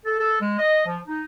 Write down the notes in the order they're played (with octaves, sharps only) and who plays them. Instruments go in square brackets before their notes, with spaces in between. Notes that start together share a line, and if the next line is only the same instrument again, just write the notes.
[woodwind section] A4
A4
G#3
D#5
F3
D#4